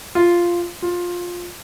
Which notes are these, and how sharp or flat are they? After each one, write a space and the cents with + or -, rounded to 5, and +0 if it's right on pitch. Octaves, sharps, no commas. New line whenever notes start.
F4 -5
F4 +15